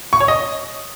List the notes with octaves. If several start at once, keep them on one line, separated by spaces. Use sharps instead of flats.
C#6
C#5
D#5